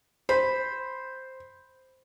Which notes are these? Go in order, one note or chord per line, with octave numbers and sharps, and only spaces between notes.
C5 B5